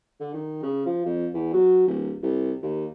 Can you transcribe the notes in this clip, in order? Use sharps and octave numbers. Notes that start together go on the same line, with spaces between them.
D3
D#3
C#3
F3
F2
E2
F#3
D1
C2
D#2